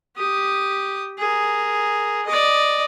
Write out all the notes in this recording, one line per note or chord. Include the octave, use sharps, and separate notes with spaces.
G4 D#6
G#4 A#4
D5 D#5